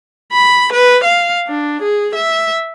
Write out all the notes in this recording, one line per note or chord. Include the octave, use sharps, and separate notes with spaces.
B5
B4
F5
D4
G#4
E5